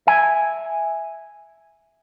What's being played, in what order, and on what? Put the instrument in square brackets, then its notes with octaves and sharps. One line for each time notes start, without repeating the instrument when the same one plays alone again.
[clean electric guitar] E5 G#5